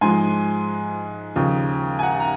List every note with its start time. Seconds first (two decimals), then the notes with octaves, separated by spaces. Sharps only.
0.01 G#2 F3 G#3 G#5 C6
1.36 D#2 C#3 F3
1.99 G#5
2.03 F#5 A#5
2.20 A#5